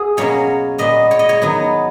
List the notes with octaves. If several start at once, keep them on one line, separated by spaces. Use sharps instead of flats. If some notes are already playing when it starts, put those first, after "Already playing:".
Already playing: F#4 G#4
B2 F#3 A#3 C#4 C#5
A#2 G#3 B3 D#5
C#5
D#5
C#5
D#3 F#3 B3